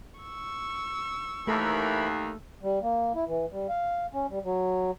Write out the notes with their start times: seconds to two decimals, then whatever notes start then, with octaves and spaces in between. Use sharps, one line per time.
0.20 C#6 E6
1.47 D#2 E3 A3 A4 A#4 B5
2.63 G3
2.82 A#3
3.15 E4
3.27 E3
3.51 G3
3.69 F5
4.13 C#4
4.29 G3
4.44 F#3